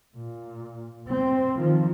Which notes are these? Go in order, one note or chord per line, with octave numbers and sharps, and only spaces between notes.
A#2
C4
D#3 F3